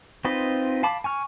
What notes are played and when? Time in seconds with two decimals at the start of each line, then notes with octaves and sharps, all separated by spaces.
0.25 C4 D#4 F4 B4 D#5
0.83 F5 A5 B5 D6
1.04 G#5 C#6 F6